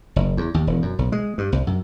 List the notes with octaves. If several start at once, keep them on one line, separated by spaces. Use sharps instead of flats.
F#1
E2
D#2
E1
F#2
B1
G#3
G2
C2
F#2